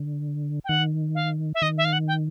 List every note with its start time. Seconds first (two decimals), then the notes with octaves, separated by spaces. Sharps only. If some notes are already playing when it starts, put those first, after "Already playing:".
Already playing: D3
0.65 G5
0.69 D#3 F#5
1.15 F5
1.54 E5
1.62 D#3 D#5
1.78 E5
1.85 F5
1.93 F#5
2.08 G5